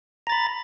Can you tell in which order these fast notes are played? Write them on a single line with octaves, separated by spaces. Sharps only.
A#5 A6 B5